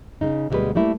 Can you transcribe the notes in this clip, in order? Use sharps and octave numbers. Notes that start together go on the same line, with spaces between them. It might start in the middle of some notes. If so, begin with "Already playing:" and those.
C#3 D#4
D2 B2 E3 G3 G#3 B4
G3 A3 A#3 E4 A#4